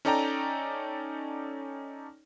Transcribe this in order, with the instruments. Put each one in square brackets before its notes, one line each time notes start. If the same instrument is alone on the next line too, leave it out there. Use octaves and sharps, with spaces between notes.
[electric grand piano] C#4 D#4 A4 D5 G5 A#5